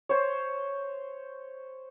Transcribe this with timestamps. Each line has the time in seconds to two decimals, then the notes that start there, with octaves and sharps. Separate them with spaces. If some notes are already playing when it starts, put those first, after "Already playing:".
0.09 C5 C#5